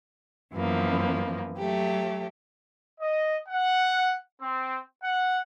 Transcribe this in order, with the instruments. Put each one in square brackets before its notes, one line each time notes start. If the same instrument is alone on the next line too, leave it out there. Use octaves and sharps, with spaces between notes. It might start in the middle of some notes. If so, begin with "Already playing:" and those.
[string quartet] F#2 E3 F3 A#3 B3
F#3 A3 G4
[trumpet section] D#5
F#5
C4
F#5